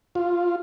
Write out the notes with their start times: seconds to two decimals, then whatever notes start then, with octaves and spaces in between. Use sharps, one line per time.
0.15 F4